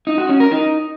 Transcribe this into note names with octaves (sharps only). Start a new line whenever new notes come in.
D#4
F#4
C#4
A#4
D#4